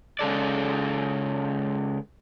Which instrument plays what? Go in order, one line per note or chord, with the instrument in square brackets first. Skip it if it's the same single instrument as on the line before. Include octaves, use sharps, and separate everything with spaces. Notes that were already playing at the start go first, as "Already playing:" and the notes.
[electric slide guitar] C#3 G#3 A4 D5